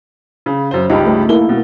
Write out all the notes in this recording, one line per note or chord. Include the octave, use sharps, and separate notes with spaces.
C#3
F#2 C5
C#2 G2 D#4 G4
A3
A#3 E4 A4 G7
B2